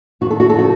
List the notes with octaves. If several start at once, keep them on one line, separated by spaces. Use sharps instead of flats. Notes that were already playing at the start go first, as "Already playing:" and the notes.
F2 D#3 F#4
A4
F#4
A4
C#3 F3 F#4